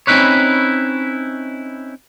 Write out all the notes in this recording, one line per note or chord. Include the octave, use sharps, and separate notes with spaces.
C4 C#4 D#4 E4 B4 C#5